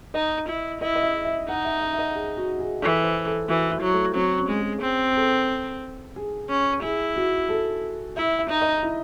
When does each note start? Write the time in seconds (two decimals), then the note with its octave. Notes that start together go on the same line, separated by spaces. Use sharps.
0.14 D#4 D#5
0.48 E4
0.81 E4 D#5
0.96 D#5
1.03 E5
1.25 E5
1.48 D#4 F#5
1.65 E5
1.81 E5
1.93 E5
1.98 D#5
2.14 G#4
2.37 F#4
2.59 G#4
2.81 E3 A4
3.04 C5
3.26 A4
3.48 E3 F#4
3.71 E4
3.81 F#3
3.93 A3
4.15 F#3 C4
4.38 C#4
4.49 G#3
4.60 G#4
4.82 C4
5.16 A4
6.16 G#4
6.50 C#4
6.83 E4 G#4
7.16 F#4
7.49 A4
8.16 E4 E5
8.39 E5
8.49 D#4
8.62 D#5
8.83 E4